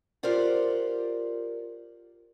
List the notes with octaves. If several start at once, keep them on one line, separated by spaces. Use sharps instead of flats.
F4 G4 A#4 C5 D5 F#5